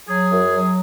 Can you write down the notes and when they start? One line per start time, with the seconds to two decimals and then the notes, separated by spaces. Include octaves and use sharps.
0.08 F#3 G#4
0.32 F#2
0.54 F#3